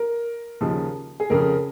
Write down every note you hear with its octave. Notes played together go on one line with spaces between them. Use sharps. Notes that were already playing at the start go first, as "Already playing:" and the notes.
Already playing: A#4
D#2 C#3 F3
G#4
F2 C#3 F3 A#4